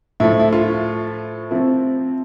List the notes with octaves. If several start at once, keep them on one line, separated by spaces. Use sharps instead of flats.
A2 F3 A3 E4
E4
F4
C3 F3 C4 E4